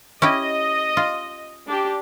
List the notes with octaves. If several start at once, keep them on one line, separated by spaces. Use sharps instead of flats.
C#4 E4 G4 D#5
F4
D4 G4